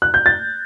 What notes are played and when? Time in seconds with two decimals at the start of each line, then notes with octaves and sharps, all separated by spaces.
0.02 F#6
0.14 G6
0.26 A6